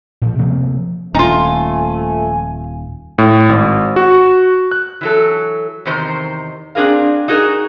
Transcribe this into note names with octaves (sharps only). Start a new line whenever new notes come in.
A#2 F3
C3 F3 A#3 C4
D#1 F3 A3 D#4 F4 G#5
A2
G#1
F#4
F#6
E3 F#3 A4
E2 C3 D#3 C5 A#5
C4 D4 G#4 A#4 F5
D#4 F#4 G#4 A#4